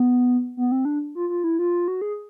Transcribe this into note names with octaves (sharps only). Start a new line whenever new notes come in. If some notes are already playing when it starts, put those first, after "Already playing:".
Already playing: B3
B3
C4
D4
F4
F4
E4
F4
F#4
G#4